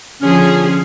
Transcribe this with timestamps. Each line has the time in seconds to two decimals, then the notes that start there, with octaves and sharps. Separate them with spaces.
0.22 D3 F3 C#4 G#4